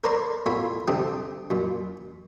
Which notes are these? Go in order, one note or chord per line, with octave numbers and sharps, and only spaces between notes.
A#4 B4 C#5 D5 A#5 C6
A2 B3 F4 C#5 B5
C2 D3 C4 D4 G4 D#6
F#2 A#2